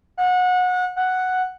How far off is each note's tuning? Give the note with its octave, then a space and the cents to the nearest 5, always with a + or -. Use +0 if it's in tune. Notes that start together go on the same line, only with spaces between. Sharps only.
F#5 -25
F#5 +0